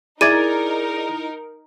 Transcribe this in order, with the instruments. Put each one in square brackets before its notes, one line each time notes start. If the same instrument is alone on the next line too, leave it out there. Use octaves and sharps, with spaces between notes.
[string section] D#4 A#4 [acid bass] E4 [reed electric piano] G#4 D5 [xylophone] G#6 A6 D#7